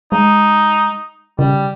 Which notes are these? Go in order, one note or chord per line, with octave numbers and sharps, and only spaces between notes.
G#3 D#4
C#3 G3